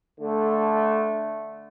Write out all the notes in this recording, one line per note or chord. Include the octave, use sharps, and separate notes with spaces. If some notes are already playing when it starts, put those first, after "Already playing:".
D3 A3